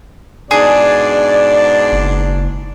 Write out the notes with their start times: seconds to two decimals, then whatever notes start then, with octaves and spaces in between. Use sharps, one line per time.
0.51 G#2 B2 D4 G#4 D5
1.92 F#1